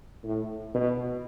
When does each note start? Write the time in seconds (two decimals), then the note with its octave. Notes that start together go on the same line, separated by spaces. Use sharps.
0.24 A2
0.74 B2